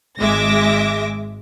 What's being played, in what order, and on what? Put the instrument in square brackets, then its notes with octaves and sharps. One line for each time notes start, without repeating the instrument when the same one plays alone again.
[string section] G#1 G#3 E5 D6 A#6